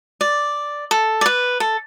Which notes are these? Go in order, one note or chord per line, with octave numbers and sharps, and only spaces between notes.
D5
A4
D5
B4
A4